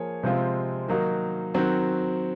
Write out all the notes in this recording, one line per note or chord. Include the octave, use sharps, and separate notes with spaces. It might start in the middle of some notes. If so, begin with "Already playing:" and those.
Already playing: F3 A#3 G#4 C#5
C3 F3 G#3 C4 F4
D#3 F#3 A#3 D#4 F#4
D#3 F#3 C4 F#4